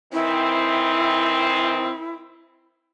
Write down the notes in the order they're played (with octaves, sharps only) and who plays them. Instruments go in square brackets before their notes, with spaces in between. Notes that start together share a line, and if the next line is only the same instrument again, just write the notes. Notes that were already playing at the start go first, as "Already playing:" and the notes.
[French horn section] D#3 E3 C4 [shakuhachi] E4